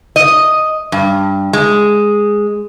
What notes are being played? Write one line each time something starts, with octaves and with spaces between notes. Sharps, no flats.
D#5
G2
G#3